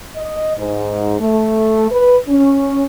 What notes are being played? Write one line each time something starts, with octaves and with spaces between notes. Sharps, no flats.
D#5
G#2
A3
B4
C#4